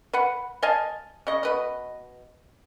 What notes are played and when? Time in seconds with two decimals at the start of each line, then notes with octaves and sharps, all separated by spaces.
0.13 B4 F#5
0.63 D#5 F5 G#5 A5
1.27 C#3 D#5
1.43 B2 B4 D#5